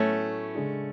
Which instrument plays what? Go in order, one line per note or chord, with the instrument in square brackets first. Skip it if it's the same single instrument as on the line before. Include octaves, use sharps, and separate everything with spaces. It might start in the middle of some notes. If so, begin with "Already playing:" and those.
Already playing: [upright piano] A2 F#3 B3 [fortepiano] A3 C#4
[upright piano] C#3 G#3 D4 G#4